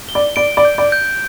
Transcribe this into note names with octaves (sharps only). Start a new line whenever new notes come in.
G7
D5
D5 D7
D5
G6
D5
G6